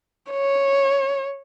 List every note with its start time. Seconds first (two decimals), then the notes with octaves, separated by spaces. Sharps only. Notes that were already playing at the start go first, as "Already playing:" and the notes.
0.31 C#5